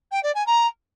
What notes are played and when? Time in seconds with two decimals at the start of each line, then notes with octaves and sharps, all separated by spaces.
0.11 G5
0.23 D5
0.35 G#5
0.47 A#5